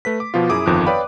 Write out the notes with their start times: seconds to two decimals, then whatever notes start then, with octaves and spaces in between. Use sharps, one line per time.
0.05 A3 B4 B6
0.20 D6
0.34 B2 F3 B3 F4
0.49 F#2 E4 G#4 D6 D#6
0.66 G1 F2 D#3 F3 F#6
0.86 B4 C#5 D5 F5 G5 B5